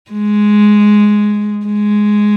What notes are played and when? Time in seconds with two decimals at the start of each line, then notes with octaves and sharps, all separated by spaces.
0.11 G#3
1.66 G#3